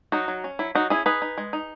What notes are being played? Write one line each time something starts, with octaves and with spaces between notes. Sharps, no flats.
F#3 D#4 F#4
F#3
C#4
F#3 E4
F#3 D#4 F#4
C#4 E4 G#4
D#4 G#4 B4
D#4
G#3
D#4